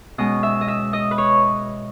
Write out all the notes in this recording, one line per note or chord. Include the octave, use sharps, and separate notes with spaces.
B2 G#3 C#4 D#5
E5
D#5
E5
D#5
B4
C#5